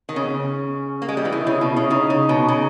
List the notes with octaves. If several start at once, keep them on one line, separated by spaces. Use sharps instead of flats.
D#3
C#3 C#4
B3
C#4
A#3
G#3
G3
E3
D#3 E4
C#3 E4
B2 E4
C#3 E4
C#3 D#4
C#3
B2
C#3